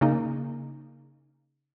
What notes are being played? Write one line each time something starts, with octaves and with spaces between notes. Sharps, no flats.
C#3 A#3 D#4